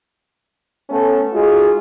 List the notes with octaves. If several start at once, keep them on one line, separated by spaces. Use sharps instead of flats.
A3 B3 C#4 A4
G#3 D#4 F4 F#4 G#4